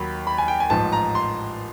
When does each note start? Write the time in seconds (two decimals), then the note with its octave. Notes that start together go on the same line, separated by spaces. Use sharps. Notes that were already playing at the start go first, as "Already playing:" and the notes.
Already playing: D#2 D#3 F#3 B5
0.27 B5
0.38 G#5
0.48 G5
0.60 G#5
0.70 A1 G#2 F3 A5
0.92 A#5
1.15 C6